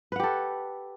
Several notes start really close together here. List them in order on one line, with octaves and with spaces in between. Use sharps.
B4 F#5 G4 A4